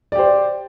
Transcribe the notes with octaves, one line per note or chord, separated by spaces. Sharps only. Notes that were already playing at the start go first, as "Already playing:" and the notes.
G4 C5 D5